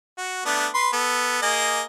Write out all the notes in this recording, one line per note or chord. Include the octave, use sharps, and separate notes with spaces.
F#4
A3 B3 D4
B4 C6
B3 A4
A#3 G#4 D#5